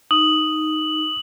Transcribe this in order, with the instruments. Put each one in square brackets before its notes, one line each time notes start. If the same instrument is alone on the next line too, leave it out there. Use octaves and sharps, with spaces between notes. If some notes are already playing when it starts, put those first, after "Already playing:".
[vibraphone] D#4 [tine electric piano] D#6 [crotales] F#7